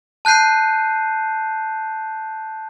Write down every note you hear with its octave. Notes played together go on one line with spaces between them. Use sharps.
A5 F#6 G6 C7 D#7